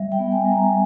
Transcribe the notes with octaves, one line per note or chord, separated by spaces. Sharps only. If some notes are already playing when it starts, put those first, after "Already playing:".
Already playing: G3 E5
G5
B3
G#5
G3
A#5